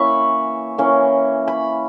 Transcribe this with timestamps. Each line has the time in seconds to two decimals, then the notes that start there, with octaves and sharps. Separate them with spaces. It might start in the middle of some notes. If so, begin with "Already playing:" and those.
Already playing: E3 A#3 C#4 E5 B5 C#6
0.78 E3 A#3 C#4
1.48 B5